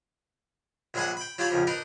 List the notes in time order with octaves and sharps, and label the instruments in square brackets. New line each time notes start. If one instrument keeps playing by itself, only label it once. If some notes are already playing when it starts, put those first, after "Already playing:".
[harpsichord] A#1 F#3 G#3 G#4 B4 F#5
G5 B5
F#3 F4 G4 C#5 A5 B5
A#1 F2 C#3 F3
D4 D#4 A#4 B4